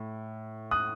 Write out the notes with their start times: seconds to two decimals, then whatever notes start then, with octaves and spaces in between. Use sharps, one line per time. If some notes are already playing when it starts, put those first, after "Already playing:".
Already playing: A2
0.71 D#6 F#6